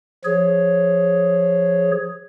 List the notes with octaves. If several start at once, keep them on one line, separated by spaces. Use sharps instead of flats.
F3 G#4 C#5